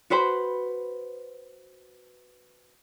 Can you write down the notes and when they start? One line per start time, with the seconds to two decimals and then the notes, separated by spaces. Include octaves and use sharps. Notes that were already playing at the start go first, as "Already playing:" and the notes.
0.10 F#4 B4 C5 B5